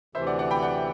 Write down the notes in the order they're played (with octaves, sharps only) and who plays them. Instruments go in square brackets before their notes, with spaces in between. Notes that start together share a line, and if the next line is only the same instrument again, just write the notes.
[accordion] D2 C3 E3 [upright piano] C5 E5
[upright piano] D5 F#5
D5 F#5
G5 B5
D5 F#5